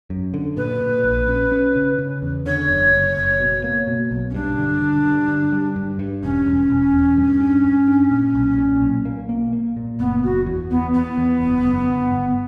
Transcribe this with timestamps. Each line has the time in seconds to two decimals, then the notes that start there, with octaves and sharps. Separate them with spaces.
0.10 F#2
0.34 D3
0.57 A#2 B4
0.81 A#2
1.05 A#1
1.28 C#4
1.52 C#4
1.76 C#3
1.99 C#3
2.22 E2
2.46 D3 C#5
2.69 F#1
2.93 F#1
3.17 F#1
3.40 B2
3.64 A#3
3.87 B2
4.11 B1
4.30 C#4
4.34 G2 D4
4.58 D3
4.81 D3
5.05 G2
5.28 D3
5.52 G3
5.76 G2
5.99 G2
6.23 E1 C#4
6.46 E1
6.70 E1
6.93 E2
7.17 G2
7.41 D4
7.64 G2
7.88 D4
8.11 A#2
8.35 B1
8.58 A#2
8.82 B1
9.05 A#3
9.29 A#3
9.53 A#3
9.77 A#2
9.99 F#1 B3
10.23 F#1 F#4
10.46 E2
10.71 E2 B3
10.93 E2 B3
11.18 E2
11.41 F#1
11.65 F#1
11.88 G1
12.12 G1